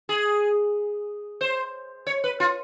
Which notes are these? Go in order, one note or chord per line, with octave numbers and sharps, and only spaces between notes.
G#4
C5
C#5
B4
F4